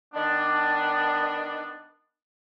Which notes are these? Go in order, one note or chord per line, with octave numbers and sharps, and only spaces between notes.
D#3 B3 D4